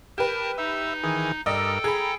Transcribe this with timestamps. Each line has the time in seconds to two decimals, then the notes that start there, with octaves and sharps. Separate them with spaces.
0.18 G4 A#4 B4 A5
0.58 D#4 E5
1.03 D#3 E3 G#4
1.46 G2 A4 A#4 D5 D#5 G5 E6
1.84 G#4 A#5 B5